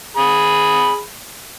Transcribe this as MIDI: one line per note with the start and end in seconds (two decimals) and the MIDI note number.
0.17 1.02 68
0.17 1.02 83